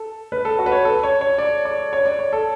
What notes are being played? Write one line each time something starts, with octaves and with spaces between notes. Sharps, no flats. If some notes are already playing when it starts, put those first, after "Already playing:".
Already playing: A4
B4
A4
F#4
B4
C#5
A4
C#5
C#5
D5
D5
C#5
D5
C#5
A4